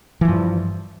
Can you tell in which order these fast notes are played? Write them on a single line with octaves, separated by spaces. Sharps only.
E3 F3 G2